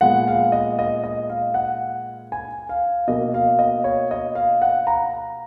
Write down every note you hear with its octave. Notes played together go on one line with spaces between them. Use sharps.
A#2 G#3 B3 F#5
F5
D#5
D#5
D#5
F5
F#5
G#5
F5
B2 A#3 D#5
F5
D#5
C#5
D#5
F5
F#5
A#5